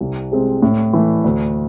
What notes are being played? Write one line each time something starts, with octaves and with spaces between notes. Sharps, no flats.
C2
C3 G#3 C4
A2
E3 A3
D2